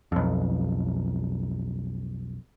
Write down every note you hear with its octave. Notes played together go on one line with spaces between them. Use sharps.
B1 F2